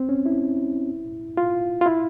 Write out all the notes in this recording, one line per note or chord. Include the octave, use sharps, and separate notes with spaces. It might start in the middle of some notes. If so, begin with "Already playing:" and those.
Already playing: C4
C#4
E4
F4
F4
E4